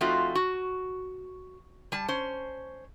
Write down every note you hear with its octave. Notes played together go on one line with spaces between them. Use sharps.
F3 A3 C4 D#4 F4 F#4
F#4
G3 A5
C#4 C5